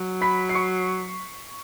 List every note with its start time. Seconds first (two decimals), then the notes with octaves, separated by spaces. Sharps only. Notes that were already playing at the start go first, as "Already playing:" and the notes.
Already playing: F#3
0.21 B5 B6
0.49 C7
0.54 C#6 C#7